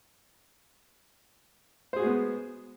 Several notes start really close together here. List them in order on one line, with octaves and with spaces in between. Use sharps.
C5 G#4 F#4 G#3 B3